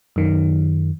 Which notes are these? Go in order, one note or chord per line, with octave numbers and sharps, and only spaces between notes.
F#2 D#3